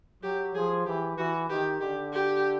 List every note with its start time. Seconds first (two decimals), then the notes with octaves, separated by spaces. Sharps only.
0.23 F#3 G4
0.55 F3 G#4
0.86 E3 G4
1.18 E3 F#4
1.49 D#3 G4
1.81 D3 G4
2.13 G4